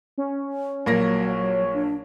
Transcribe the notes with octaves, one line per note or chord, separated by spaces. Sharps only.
C#4
A#1 F#3 A#3 C#5 A#6
D4